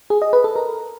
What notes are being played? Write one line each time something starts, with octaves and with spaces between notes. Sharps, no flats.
G#4
D#5
B4
A4
A#4